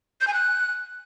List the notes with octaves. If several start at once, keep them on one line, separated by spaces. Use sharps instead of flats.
G6
G#5
F#6